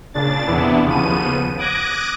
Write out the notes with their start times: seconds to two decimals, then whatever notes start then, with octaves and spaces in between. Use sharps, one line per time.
0.14 A#2 C#3 D4 A6
0.47 E2 C3 E3 B3 D4 E4
0.85 D#2 C#3 F3 B3 D#7
1.58 D6 D#6 F#6 G#6 A#6 D7